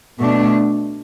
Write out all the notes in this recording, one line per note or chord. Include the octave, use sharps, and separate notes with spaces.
B2 A3 D4